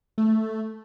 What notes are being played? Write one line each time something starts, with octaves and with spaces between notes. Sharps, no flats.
A3